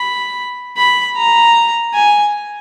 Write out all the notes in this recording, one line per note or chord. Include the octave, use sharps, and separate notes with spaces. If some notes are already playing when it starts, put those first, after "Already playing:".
Already playing: B5
B5
A#5
G#5